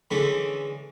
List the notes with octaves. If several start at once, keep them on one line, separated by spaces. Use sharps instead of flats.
D3 E3 G#3 C#4 D4 B5